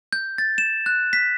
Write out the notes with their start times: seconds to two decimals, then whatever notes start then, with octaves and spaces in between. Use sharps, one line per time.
0.13 G6
0.38 A6
0.58 E7
0.86 F#6
1.13 B6